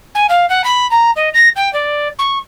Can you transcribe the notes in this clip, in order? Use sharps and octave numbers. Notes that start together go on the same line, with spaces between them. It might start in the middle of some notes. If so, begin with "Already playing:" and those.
G#5
F5
F#5
B5
A#5
D#5
A#6
G5
D5
C#6